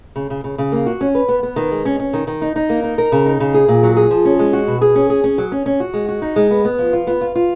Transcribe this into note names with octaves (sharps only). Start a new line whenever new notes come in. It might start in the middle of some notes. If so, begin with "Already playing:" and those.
C#3
C#3
C#3
C#3
A#3
F#4
C#4
B4
B3
B3
D#3
G#3
C#4
C#4
D#3
D#3
D#4
D#4
A#3
D#4
A#4
C#3
D#4
C#3
G#4
A#2
F#3
G#4
F3
C#4
G#3
F#4
B2
G#4
C#4
G#4
C#4
F#3
C#4
C#4
F#4
G#3
F#4
D#4
G#3
B3
B3
F3
F4
B3
F4
F4